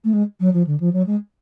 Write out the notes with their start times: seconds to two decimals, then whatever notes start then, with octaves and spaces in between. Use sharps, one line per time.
0.04 A3
0.13 G#3
0.40 F#3
0.53 F3
0.66 D3
0.80 F3
0.93 F#3
1.06 G#3